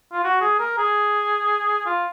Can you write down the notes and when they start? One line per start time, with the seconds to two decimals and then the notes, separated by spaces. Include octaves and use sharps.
0.12 F4
0.24 F#4
0.41 G#4
0.59 A#4
0.78 G#4
1.86 F4